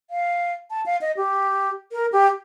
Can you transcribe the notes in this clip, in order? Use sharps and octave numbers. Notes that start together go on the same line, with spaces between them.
F5
A5
F5
D#5
G4
A#4
G4